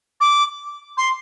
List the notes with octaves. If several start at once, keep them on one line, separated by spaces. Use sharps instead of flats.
D6
C6